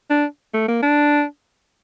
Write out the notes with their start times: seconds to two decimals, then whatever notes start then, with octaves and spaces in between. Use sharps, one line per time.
0.10 D4
0.54 A3
0.68 A#3
0.83 D4